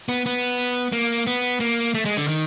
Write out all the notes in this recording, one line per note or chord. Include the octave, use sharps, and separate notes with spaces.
B3
B3
A#3
B3
A#3
A3
G#3
D3
D#3